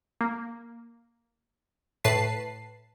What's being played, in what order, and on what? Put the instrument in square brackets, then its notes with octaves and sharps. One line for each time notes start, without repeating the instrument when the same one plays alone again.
[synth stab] A#3
A2 B4 A5 C7